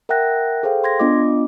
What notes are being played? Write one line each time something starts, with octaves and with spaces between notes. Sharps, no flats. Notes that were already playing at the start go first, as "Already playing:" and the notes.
A#4 E5 F#5 G5 F#6 A#6
G#4 A4 C5 F5 G5
C6 G#6 A#6
B3 D4 F4 D#5 D6